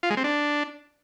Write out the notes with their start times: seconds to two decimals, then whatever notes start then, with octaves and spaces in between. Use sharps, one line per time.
0.03 F4
0.10 G#3
0.17 C4
0.24 D4